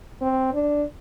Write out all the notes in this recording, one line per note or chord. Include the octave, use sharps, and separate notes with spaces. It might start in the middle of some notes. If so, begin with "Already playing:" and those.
C4
D4